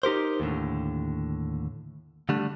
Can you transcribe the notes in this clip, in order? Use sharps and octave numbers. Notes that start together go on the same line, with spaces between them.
D#4 G4 A#4 C5
D#2 A2 D3
D3 G3 A3 D4